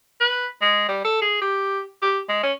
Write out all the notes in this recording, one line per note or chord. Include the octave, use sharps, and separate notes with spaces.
B4
G#3
G3
A4
G#4
G4
G4
G#3
C#4